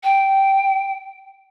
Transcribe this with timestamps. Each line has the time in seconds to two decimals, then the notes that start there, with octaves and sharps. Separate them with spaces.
0.04 G5